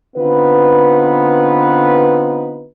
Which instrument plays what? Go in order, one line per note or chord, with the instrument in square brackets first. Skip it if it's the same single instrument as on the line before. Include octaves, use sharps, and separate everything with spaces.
[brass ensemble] D3 B3 C4 D#4 F4 B4